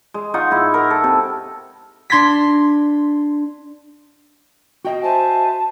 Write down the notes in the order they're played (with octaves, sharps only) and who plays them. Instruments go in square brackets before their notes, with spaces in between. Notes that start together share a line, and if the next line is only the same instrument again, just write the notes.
[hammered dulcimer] G#3
D#4 F4 F#5 C#6
G#2 E4
A#4
A4
C3
[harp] D4 C6 G#6 A#6 B6
[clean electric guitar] F#4 D#5 [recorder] G5
[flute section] C5 E5 G#5 [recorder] A5